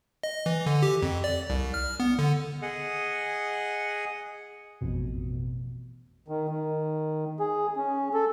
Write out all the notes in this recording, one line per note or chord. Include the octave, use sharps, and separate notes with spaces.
D#5
E3
D3
G4
F2
D5
C2
F6
B3
D3
G#4 D#5 F#5
A1 F2 B2
D#3
D#3
G#4
C#4
A4